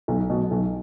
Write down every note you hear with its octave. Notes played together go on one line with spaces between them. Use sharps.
B1
B2 F#3
B1